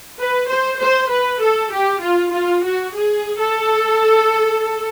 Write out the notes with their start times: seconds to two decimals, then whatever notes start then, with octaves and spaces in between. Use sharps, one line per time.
0.19 B4
0.49 C5
0.81 C5
1.10 B4
1.41 A4
1.72 G4
2.02 F4
2.33 F4
2.64 F#4
2.94 G#4
3.40 A4